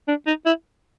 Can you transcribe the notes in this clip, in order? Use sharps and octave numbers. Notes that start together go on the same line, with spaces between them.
D4
D#4
E4